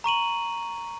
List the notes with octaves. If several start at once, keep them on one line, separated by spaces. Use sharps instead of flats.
A#5 C#6 D#7 F#7